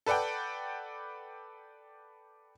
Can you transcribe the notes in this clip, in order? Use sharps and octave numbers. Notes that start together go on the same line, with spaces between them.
A4 B4 D5 F#5 G5